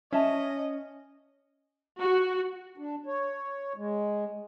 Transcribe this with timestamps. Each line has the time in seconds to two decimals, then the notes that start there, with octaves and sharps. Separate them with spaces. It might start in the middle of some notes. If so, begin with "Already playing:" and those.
0.13 C#4 D#5 E5 A5
2.00 F#4
2.78 D4
3.06 C#5
3.76 G#3